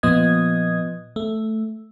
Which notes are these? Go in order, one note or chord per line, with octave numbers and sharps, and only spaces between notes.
A#2 F3 B3 D#5 D#6 G#6
A3